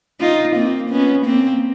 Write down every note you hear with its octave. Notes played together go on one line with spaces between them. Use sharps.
D#4 F4
A#3 C4
B3 C#4
A#3 C4